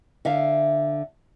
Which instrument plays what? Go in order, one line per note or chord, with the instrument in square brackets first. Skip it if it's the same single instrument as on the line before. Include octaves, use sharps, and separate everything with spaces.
[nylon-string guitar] D3 E5 F5